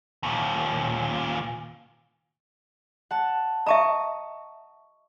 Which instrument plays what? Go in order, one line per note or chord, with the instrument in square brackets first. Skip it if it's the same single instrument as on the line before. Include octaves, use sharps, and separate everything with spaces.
[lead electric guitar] D#2 A#2
[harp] F#5 A5
[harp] D#5 C#6 [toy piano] E5 A5 A#5